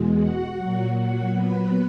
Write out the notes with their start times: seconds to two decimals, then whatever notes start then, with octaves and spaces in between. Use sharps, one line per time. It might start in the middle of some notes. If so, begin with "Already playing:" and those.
Already playing: E2 B2 G#3
0.19 F#4 F#5
0.57 F#3
0.62 A#2
0.95 F#4 F#5
1.32 B3 B4